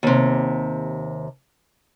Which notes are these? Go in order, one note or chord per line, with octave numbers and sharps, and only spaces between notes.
D#2 C3